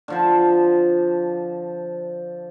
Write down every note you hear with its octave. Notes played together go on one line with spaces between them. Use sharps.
D3 F3 C5